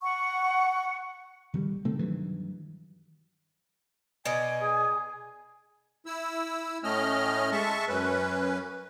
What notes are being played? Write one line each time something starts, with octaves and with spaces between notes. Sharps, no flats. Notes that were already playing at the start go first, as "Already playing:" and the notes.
F#5 C#6
D#3 F#3 G3
C3 A3 C4
G2 D#3 E3 F#3
B2 D5 D#5 G#5
G#4
E4 E6
A2 A3 C#4 D#5 F6
G#3 E5 A5 C#6
F#2 C#4 B4